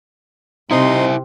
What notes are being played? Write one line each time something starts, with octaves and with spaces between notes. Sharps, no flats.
C3 C4 D#4 E4 C5 C6 D#6